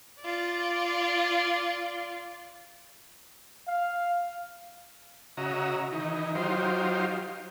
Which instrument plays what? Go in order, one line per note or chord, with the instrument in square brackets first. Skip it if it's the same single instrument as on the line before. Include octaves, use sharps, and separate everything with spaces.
[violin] F4 D5
[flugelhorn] F5
[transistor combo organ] C#3 F#4 D#5 E5 A#5
D#3 E3 D#4
F#3 D#4 F4 G4 C5